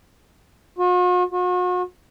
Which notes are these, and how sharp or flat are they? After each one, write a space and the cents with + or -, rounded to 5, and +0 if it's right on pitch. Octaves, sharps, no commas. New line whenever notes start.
F#4 -45
F#4 -40